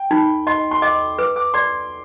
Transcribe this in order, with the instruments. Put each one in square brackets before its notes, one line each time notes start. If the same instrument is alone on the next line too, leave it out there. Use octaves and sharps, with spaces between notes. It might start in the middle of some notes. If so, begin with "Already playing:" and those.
Already playing: [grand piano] G5
[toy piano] D#4 [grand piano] B5
[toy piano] D#5 [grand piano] C6
[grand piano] C6
[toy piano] D#5 [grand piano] D6
[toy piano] B4 [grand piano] D6
[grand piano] D6
[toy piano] D5 [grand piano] C6